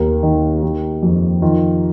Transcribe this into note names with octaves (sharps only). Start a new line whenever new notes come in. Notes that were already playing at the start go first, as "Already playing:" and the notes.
Already playing: D#2 A#4
D#3
D#3
F2
D#3 F4